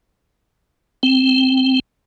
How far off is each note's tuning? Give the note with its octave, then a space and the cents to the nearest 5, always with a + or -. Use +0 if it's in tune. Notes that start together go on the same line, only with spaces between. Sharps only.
C4 +0